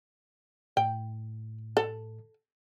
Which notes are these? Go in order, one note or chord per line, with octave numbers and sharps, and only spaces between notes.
A2 G5
A4